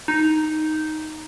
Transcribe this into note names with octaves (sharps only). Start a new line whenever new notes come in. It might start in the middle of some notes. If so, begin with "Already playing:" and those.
D#4